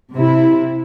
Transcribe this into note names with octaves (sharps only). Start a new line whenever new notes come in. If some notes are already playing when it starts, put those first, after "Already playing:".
C3 E4